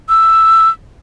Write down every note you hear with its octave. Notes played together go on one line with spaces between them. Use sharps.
E6